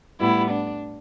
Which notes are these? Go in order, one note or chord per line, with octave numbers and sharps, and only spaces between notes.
A2 G3 B3 E4
D4